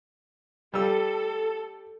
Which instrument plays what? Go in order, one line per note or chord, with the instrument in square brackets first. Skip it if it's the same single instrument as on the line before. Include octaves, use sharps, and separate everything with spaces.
[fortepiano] G3 E6 [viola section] A4